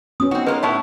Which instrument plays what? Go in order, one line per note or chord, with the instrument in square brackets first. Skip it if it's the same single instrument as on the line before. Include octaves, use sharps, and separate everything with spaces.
[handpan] B3 C#4 F#4 [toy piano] D#6
[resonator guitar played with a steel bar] C4 F#4 [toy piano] D4 [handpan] D#4
[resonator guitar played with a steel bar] G#3 A#3 F4 [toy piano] B4
[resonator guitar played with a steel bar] A2 B3 E4 [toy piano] C#5 A5 C#6